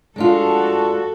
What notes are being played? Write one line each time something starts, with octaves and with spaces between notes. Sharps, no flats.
G#3 D4 F4 F#4 A4